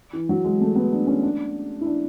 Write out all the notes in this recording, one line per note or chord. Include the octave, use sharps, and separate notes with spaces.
E3
F#3
G#3
A3
B3
D4
C#4
D4
E4
D4